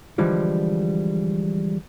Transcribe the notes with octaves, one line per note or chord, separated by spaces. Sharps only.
D3 E3 F3 G3 G#3